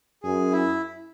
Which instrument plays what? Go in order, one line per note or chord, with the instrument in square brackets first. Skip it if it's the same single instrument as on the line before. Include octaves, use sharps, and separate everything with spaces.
[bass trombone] F#2 [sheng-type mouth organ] G#4
[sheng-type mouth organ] E4